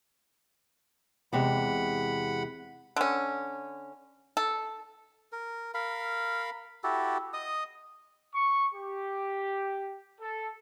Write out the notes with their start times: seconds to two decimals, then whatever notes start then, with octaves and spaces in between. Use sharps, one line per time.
1.33 E2 C3 G#3 F#5 B5
2.96 D3 C#4
4.37 A4
5.32 A#4
5.74 A#4 F5 B5
6.84 E4 F#4 G4 A4
7.33 D#5 D#6
8.34 C#6
8.74 G4
10.21 A4